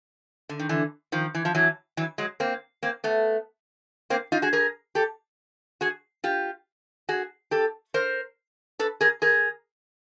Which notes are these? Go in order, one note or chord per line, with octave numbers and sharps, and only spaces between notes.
D3
D#3
D3 E3
D#3 F3
E3
F3
E3 F#3
E3 F#3
F#3 G#3
A#3 C4
A#3 C4
A3 B3
A#3 C4
D#4 F4
F#4 G#4
G#4 A#4
G4 A4
F#4 G#4
F4 G4
F#4 G#4
G4 A4
A#4 C5
A4 B4
G#4 A#4
G#4 A#4